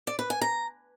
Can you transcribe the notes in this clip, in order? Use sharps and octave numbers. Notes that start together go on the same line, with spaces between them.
D5
B4
G#5
A#5